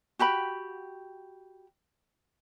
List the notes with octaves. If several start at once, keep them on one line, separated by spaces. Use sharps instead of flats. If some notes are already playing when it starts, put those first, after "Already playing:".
F#4 G4 G5 B5